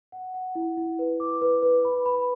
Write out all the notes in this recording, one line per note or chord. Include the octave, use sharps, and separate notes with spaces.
F#5
F#5
E4
E4
B4
D6
B4
B4
B5
B5